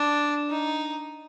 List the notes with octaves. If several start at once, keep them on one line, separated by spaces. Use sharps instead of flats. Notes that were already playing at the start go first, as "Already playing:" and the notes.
Already playing: D4
D#4